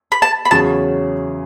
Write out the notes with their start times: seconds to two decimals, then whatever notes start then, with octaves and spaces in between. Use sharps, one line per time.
0.12 B5
0.22 A5
0.45 B5
0.51 E2 C#3 F#3 C#4 G#4 A5